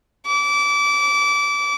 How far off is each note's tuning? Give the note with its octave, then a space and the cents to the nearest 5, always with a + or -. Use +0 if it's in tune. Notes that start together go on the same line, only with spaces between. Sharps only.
D6 -25